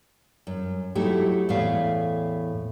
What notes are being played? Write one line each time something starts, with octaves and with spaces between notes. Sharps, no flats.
F#2
F#3 A3 D#4 E4 G4
E2 A2 A3 E5 F5